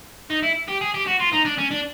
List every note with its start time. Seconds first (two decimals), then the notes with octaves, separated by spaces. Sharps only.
0.30 D#4
0.43 E4
0.68 G4
0.81 G#4
0.94 G4
1.07 F#4
1.20 F4
1.33 D#4
1.45 D4
1.58 C#4
1.71 D4